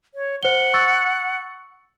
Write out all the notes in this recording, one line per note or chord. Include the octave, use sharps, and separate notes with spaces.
C#5
C5 F#5 G7
C#6 E6 A6